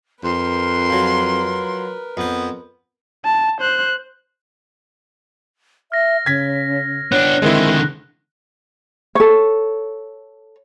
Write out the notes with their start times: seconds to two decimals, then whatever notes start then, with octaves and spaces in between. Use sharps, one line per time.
0.24 F2 A#4 B4 C6
0.90 F3 F#3
2.17 F2 B3 C5
3.25 A5
3.61 C5 F#6
5.92 E5 F6 A#6
6.26 C#3 G#6 B6
7.12 B3 D4 C#5 F#6
7.42 D3 D#3 G#3 C4 E4 A#4
9.15 A4 C#5